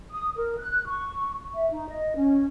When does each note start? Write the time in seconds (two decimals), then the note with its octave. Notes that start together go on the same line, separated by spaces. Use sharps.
0.11 D#6
0.36 A#4
0.58 F#6
0.87 C#6
1.54 E5
1.71 D#4
1.89 D#5
2.16 C#4